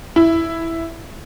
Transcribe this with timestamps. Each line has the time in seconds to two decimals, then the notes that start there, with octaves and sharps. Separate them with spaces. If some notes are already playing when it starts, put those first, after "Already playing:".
0.16 E4